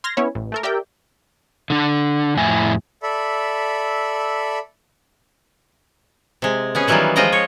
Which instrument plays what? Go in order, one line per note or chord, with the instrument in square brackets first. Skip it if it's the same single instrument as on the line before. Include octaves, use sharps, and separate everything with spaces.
[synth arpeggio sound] C6 F6 G#6 A#6
B3 C#4 E4 C#5
A1
A3 A4 A#4
G4 A#4 D5 E5 G5
[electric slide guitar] D3 D4
F2 A2 E4 G#5
[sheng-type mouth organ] A4 D5 E5 B5
[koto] C3 G#3
B3 C#4 G#4
D#3 E3 F#3 G3 D#4 F4
F3 G#3 F4 D#5 G5 A#5
C#5